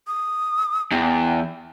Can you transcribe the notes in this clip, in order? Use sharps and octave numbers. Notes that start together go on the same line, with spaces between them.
D#6
E2 G5